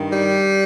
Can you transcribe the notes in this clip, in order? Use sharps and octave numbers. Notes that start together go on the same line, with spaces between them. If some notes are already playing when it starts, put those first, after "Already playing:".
Already playing: G2 D#3
G3